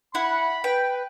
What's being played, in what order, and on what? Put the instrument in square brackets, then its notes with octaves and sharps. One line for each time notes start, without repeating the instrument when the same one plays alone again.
[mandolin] E4 [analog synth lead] F#5 [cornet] B5
[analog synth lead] B4 [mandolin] G5